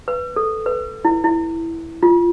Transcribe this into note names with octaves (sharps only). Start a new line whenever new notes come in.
B4
A4
B4
E4
E4
F4